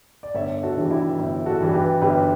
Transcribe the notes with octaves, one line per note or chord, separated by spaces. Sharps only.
D5
G1 C#5 E5
F#4 A4
G2 E3 G3
E4 G4
G1
F#4 A4
G2 E3 G3
G4 B4
G1 G4 B4